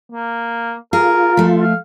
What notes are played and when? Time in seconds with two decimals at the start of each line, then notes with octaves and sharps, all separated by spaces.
0.12 A#3
0.93 F4 G#4 A#4
1.37 F3 A3
1.62 F5